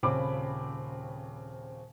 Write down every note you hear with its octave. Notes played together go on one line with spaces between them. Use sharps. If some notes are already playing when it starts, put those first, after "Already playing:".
D#1 C#3 C4 B5 D6